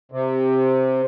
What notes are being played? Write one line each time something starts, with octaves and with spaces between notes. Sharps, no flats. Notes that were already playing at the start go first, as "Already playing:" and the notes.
C3